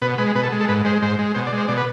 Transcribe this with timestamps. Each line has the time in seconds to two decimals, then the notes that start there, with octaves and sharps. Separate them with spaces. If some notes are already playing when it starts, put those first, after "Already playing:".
0.02 B2 B4
0.18 G#3 B4
0.35 B2 B4
0.43 A4
0.52 G#3
0.61 A4
0.69 G#2 B4
0.84 G#3 C5
1.02 G#2 C5
1.19 G#3
1.35 B2 C5
1.47 D5
1.52 G#3
1.58 C5
1.68 B2 D5
1.77 B4